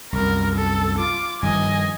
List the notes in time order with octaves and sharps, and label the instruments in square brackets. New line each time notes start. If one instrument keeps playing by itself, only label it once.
[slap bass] C2 F#2 [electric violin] A#4
[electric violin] A4
F4 D6
[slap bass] G2 D#3 F3 [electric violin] D#5 G#5